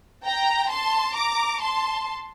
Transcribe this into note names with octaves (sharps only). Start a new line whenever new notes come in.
G5 A#5
A5 C6
A#5 D6
A5 C6